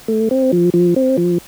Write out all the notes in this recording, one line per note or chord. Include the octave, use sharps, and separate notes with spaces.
A3
C4
F3
F3
C4
F3